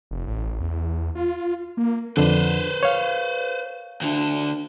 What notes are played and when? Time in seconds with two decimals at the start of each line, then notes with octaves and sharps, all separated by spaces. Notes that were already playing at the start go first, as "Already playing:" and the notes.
0.11 F1
0.27 A1
0.61 E2
1.15 F4
1.77 A#3
2.17 F2 D3 B4 C5
2.83 C#5 F5
4.02 D2 D3